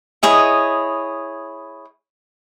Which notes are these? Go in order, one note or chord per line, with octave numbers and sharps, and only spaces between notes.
E4 G#4 C#5 D#5